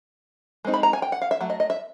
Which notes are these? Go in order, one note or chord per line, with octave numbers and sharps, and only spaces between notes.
G#3 C4 D#4
B5
A#5
G#5
G5
F#5
F5
E5
F#3 A3
D#5
D#5
E5